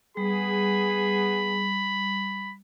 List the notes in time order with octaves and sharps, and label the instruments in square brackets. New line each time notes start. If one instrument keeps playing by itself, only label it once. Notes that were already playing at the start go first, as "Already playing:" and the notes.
[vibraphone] G3 [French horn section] B3 G#4 [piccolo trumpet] B5